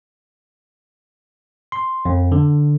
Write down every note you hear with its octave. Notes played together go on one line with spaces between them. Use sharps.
C6
F2
D3